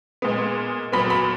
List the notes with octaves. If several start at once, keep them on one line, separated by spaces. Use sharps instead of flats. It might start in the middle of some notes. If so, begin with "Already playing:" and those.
A#2 G#3 B3
A#2 F#3 B3 B5
B5